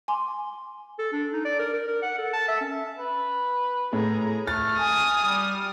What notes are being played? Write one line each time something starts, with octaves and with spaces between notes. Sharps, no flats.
G#5 C6 D6
A4
D4
D#4
D5
A#4
A#4
A#4
F#5
A4
A5
E5
C#4
B4
A2 G#4 A#5
A3 F6 A6
G#5 D#6
G3